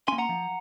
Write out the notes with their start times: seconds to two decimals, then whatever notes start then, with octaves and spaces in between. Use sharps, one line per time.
0.08 A#3 C#4 G#5 C6
0.18 F#5 A#5
0.29 F3